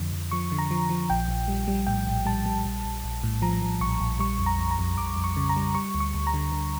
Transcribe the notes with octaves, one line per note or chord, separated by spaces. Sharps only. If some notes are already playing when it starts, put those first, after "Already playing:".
Already playing: F2 D3 F3
F2
F3 C#6
D3
A#5
F3
F3
A#1 G5
A#1
G3
G3
A2 G5
A#1
G3 A5
G3
A#1
A#1
A#1
A2
F3 A#5
F3
A#1 C#6
A#1
G3 C#6
F2
A#5
F2
A#5
F2
F2 D6
F2
C#6
C#3
A#5
G3
G3 C#6
D2
C#6
D2
A#5
D3
D3